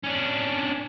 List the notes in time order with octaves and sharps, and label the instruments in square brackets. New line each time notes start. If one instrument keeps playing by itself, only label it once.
[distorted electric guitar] C#4 D4